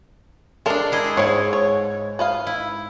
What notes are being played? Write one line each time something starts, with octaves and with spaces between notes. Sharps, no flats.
G#3 D4 A4 A#4 D5
E4 G#4 D#5
G#2 G#3 C#4 C#5
C#5
B4 D#5 F5
E4